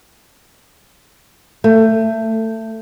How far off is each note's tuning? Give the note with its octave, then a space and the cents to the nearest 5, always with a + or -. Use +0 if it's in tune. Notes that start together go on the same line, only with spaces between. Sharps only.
A3 +20